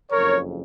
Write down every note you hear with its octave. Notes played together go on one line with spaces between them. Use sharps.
F#1 F2 C#3 A#4 C#5